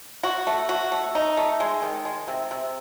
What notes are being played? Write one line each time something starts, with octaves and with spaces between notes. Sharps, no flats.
F#4
A3
F#4
A3
D#4
A3
G#3
D#3
G#3
C3
C3